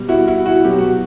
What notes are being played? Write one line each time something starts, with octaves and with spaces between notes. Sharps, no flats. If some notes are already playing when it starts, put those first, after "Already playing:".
Already playing: B2 G3
E4 F#4
E4 F#4
E4 F#4
B2 F#3 G4
F#4